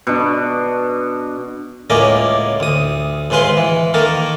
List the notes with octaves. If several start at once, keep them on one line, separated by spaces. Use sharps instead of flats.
B2 D4
C#2 A2 A#3 C#4 D5 D#5
D2 D#6
D#2 G#2 G#3 B4 F5 C6
E3
D#3 A#3 A4 A#4